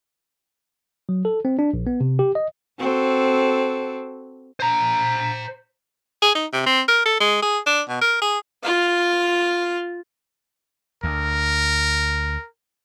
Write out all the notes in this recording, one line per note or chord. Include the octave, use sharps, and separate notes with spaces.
F#3
A4
C4
D4
A#1
B3
C3
G4
D#5
C4 F#4 A4
C5 A#5
G#4
D#4
C3
C4
A#4
A4
G#3
G#4
D4
B2
A#4
G#4
F4 F5
D2 A#4